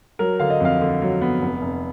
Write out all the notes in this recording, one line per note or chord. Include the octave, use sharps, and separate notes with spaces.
F#3 A#4
D3 F5
D#5
F2 F5
D3
F#3
B3
F1
F1